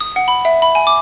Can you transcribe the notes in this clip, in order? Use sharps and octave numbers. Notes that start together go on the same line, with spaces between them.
D#6
F#5
B5
E5
B5
G#5
D6